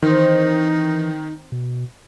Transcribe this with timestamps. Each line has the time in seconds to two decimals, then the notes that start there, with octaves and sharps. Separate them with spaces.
0.02 D#3 E3 C4 D#4 C5 F5
1.52 B2